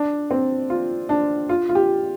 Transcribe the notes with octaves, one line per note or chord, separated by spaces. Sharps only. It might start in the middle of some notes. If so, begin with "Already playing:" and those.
Already playing: D4
C4
F4
D4
F4
F4
G4